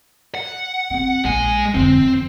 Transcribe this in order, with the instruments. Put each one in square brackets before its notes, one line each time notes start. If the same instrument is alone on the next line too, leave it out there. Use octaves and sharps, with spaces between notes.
[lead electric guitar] F#5
[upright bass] C4 C#4
[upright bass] A#1 [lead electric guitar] G#3 G#5
[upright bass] F2 D3 [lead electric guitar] C4
[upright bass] F2